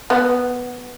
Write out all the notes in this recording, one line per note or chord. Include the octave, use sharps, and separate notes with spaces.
B3